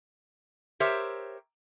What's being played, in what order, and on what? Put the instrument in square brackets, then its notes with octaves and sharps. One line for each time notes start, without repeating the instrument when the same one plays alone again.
[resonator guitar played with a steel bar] G4 A#4 C5 C#5 E5